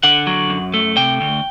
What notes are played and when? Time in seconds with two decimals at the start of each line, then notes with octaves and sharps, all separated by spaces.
0.03 D3 F#5
0.27 F#3
0.50 F#2
0.74 A3
0.97 C3 G5
1.21 D2